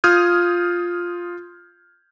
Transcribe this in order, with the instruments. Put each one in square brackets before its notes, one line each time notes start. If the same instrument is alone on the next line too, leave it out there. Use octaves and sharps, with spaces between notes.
[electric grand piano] F4 D#6 F6 G6 G#6 D#7